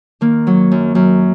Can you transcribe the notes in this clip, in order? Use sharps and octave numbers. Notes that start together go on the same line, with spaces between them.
D#3 A#3
F#3
F#2
F#2